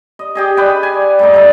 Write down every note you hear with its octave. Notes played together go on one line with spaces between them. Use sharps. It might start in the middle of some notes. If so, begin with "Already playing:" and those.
D#5
G4 G#4 D#5
B4 D5 G5
G#5
G2 A3 D#4
D3 D#4